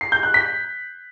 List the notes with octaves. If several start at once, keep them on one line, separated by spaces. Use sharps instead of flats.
C7
G6
F#6
B6